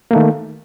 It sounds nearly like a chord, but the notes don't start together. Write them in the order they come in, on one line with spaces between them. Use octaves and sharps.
A#3 A3 D#3